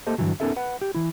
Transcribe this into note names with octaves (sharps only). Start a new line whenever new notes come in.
A3 A#3 G4 A4 C5 D#5
G2 D3 E3 F#3
B3 C#4 D#4 A4 A#4 E5
B4 F#5
G4
E3 E4